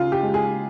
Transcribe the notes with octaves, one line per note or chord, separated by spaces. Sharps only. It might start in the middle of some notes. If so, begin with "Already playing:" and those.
Already playing: C#3 F4
G4
G#3
G#4